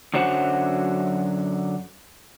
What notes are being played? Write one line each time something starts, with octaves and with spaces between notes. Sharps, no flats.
F#2 D3 F#3 C5 F#5